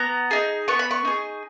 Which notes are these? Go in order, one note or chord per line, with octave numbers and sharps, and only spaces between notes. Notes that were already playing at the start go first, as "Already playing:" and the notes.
Already playing: B3 A#5
D#4 G#4
B3 C#6
B5
C#6
D#4 G#4